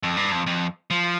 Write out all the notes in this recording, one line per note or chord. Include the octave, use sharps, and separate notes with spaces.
F2
G2
F2
F2
F3